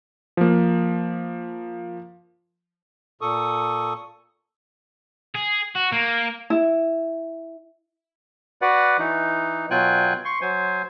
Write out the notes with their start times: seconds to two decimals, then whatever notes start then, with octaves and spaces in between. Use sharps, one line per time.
0.37 F3 A#3
3.21 A#2 A4 C#6 D#6
5.35 G#4
5.76 F#4
5.92 A#3
6.50 E4
8.62 F#4 B4 D5 F#5
8.99 E3 D#4
9.71 B2 F#3 F4 G5 G#5 F#6
10.25 C6 C#6
10.41 F#3 C5 G#5